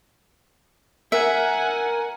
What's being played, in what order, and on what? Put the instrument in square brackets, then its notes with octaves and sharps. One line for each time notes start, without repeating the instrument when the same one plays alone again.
[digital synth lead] A#4 [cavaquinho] E5 [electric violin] F#5 G#5